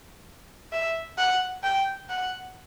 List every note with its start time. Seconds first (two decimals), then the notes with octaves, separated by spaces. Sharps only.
0.72 E5
1.18 F#5
1.63 G5
2.09 F#5